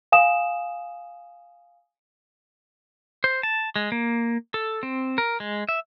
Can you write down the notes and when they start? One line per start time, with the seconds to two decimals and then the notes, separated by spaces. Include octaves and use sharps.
0.12 F5 G#5 D#6 E7
3.24 C5
3.43 A5
3.76 G#3
3.92 A#3
4.54 A4
4.83 C4
5.18 A#4
5.40 G#3
5.69 E5